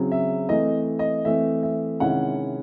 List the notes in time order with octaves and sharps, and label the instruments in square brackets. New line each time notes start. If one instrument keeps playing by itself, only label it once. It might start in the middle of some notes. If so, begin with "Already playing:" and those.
Already playing: [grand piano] C#3 F#3 C4 E4
E5
E3 A3 C4 D#5
D#5
E3 A3 C4 E5
E5
C3 D#3 G#3 C#4 E4 F#5